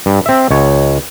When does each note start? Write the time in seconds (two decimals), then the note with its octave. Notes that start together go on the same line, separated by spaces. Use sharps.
0.06 G2
0.26 C4 E5
0.51 C#2 C#5